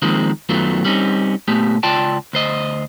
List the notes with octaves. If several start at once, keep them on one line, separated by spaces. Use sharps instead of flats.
D#3 F3 G#3 A#3 C4
F#2 D#3 F#3 A3 B3 F4
G3 C4 C#4 D#4
A#2 A3 B3 G4
C#2 F4 D5 G5 A5
D2 C5 D#5